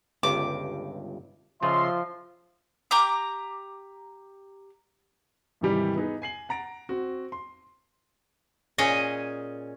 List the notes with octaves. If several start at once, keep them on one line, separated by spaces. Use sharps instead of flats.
G1 C#2 G2 D6
C#3 F3 F4 D#5 E5 C6
G4 A#5 D6
G#2 C3 D#3 E3 G3 G4
B3 D#4 G#4 B4
G#5 C7 F#7
F#5 A#5 A6 D7
C4 F#4
C6
A#2 C#4 G#4 D#5